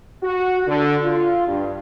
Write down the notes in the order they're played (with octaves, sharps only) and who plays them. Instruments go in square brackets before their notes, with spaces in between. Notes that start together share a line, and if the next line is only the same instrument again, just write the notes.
[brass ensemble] F#4
D3
F4
G2